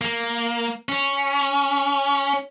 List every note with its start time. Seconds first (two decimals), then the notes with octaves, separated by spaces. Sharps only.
0.01 A#3
0.89 C#4